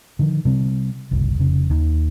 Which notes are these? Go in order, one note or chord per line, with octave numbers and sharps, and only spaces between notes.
D3 D#3 F3
C3 G3 C4
F#1 C2
F1 C#3
D#2 D#3